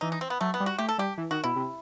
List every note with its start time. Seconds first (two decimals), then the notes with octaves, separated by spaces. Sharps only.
0.01 E3 D#4
0.12 D#4
0.21 C4
0.30 B3
0.41 F#3 A3
0.54 B3
0.60 G3
0.66 F#4
0.78 A3 G4
0.89 A4
0.98 G3 G4
1.18 E3
1.31 D#3 F#4
1.44 B2 E4
1.56 C3